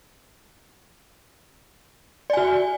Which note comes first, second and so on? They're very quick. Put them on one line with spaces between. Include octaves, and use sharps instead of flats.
D5 G#5 F#4